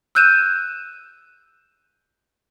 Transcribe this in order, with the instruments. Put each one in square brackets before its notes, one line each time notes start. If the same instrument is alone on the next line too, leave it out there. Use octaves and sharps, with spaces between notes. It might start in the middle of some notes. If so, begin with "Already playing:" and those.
[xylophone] E6 F#6 G6 D#7 E7